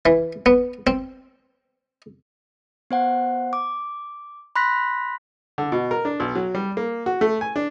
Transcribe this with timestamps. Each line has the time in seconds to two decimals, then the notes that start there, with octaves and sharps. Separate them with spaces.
0.06 E3
0.46 B3
0.87 C4
2.91 B3 C5 F#5
3.53 D6
4.56 B5 C6 F#6 A#6 B6
5.58 D3
5.72 B2
5.91 A#4
6.05 D4
6.20 B1
6.35 F#3
6.55 G3
6.77 A#3
7.06 F#4
7.21 A3
7.41 G#5
7.56 D4